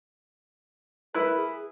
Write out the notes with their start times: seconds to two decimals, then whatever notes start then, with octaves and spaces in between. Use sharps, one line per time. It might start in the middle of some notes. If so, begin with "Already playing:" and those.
1.14 E4 A#4 B4
1.37 G#4